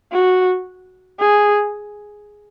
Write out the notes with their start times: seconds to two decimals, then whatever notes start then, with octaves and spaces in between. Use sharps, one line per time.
0.13 F#4
1.20 G#4